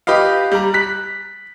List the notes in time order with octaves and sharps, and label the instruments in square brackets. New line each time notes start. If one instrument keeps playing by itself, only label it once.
[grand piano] G4 B4 D#5 F5
G3 A#5
F#6 B6